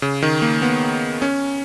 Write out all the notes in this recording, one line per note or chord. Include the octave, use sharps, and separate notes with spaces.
C#3
D#3
A#3
B3
C#4